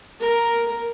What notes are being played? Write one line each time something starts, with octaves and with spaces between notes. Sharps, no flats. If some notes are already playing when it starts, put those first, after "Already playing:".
A#4